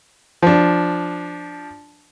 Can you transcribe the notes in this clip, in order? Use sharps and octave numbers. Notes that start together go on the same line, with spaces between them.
F3 D4